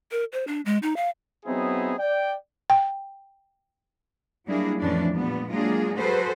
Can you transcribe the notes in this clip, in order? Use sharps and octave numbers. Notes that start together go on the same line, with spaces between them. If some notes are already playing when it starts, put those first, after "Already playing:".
A#4
C5
D4
G#3
D#4
F5
F#3 B3 C4 D#4 E4 G#4
D5 G5
G5
F#3 G3 A#3 D4 E4 G#4
F2 A2 E3 F3 C#4 D4
A#2 G3 B3
F#3 G#3 A#3 D4 F4 G#4
F#4 G#4 A4 B4 C5